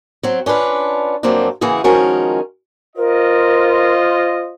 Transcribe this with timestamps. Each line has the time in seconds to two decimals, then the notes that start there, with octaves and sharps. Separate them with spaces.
0.23 F#3 C4
0.46 C#4 D4 F4 B4
1.23 F#2 F3 F#3 A#3 C4 D4
1.61 C#3 E3 A#3 F#4 G#4
1.84 D#3 F3 G#3 C#4 F#4 A#4
2.96 F4 A#4 C5 D#5